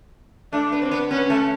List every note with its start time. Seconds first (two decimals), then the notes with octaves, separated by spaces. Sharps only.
0.53 A3 D4
0.72 B3
0.82 C4
0.91 B3
1.11 B3 C#4
1.30 A3